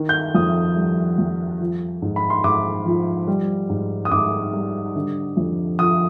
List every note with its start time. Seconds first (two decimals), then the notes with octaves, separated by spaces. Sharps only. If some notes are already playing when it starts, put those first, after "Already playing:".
Already playing: D#3
0.09 G6
0.35 F2 D#6
0.76 G3
1.19 F2
1.60 F3
2.02 G#2
2.16 B5
2.30 C6
2.44 G#2 D6
2.86 F3
3.27 G3
3.70 G#2
4.05 D#6
4.12 G#2 D6
4.53 G3
4.95 D3
5.37 F2
5.79 F3 D#6